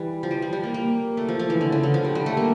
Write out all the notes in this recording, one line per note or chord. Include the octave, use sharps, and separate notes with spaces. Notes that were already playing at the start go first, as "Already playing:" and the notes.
Already playing: E3 G3
F3
G3
F3
G3
A#3
A#3
A3
F3
F3
E3
D3
C#3
D3
F3
G3
G3
A3
A#3